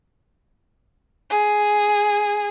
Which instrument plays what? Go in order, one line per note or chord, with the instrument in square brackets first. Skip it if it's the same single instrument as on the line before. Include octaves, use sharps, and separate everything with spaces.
[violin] G#4